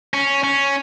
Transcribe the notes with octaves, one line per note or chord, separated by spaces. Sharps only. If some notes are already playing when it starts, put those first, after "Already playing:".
C#4
C#4